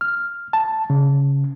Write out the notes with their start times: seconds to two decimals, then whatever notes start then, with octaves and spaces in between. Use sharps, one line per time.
0.01 F6
0.53 A5
0.90 C#3